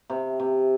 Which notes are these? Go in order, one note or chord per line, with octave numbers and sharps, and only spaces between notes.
C3
C3